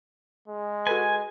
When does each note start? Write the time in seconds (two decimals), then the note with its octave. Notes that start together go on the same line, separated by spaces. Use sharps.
0.48 G#3
0.87 F#4 A4 B4 G#5